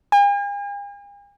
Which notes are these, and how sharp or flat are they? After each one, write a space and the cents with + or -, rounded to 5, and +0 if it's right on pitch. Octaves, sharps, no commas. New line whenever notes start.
G#5 -45